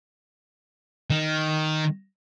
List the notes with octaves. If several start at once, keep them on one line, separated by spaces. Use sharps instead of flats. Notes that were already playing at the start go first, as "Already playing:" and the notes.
D#3